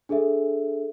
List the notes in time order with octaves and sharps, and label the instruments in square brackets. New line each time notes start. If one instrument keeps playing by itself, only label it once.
[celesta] D4 G#4 A4 E5